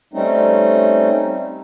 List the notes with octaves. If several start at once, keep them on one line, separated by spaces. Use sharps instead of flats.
G3 A3 C4 C#4 D#4